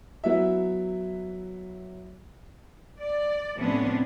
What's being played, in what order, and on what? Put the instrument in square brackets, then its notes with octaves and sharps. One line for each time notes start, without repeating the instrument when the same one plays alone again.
[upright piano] F#3 B3 E4 E5
[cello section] D5
A2 C3 F3 B3 C#4 D4